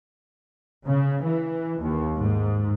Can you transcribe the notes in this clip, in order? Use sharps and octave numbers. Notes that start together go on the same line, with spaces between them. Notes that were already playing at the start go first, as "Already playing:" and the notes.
C#3
E3
D#2
G#2